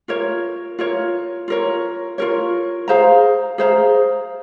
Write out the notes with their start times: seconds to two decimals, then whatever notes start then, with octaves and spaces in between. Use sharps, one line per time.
0.08 F4 A#4 C#5
0.79 F4 A#4 C#5
1.48 F4 A#4 C#5
2.18 F4 A#4 C#5
2.88 G#4 C5 F5 A#5
3.58 G#4 C5 F5 A#5